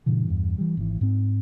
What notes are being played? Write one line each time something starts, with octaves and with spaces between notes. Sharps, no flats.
G2 A#2 C#3 E3
E2 G2
E3 G3
G#1 E3
G#2 C4